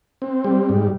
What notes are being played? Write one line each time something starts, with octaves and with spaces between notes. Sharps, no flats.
C4
G3
G#2